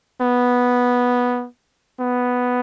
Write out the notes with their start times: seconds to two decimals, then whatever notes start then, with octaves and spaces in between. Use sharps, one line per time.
0.21 B3
2.00 B3